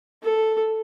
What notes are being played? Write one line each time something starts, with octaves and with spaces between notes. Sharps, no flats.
A4